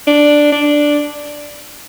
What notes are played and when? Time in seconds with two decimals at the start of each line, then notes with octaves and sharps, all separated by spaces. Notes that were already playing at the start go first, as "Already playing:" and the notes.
0.07 D4
0.52 D4